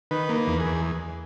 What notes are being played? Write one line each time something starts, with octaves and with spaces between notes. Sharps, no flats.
D#3 B4
A#3
B4
E2
G#4
E2